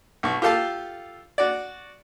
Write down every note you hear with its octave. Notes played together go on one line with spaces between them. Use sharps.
B1 C#6
F4 G4 A4 F5 A5
F#4 D5